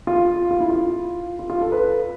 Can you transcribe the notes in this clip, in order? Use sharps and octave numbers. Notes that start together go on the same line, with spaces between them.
F4
F4
E4
F4
F4
F4
A4
B4